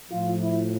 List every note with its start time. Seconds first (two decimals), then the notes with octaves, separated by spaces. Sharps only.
0.12 A2 F3 F4
0.40 E4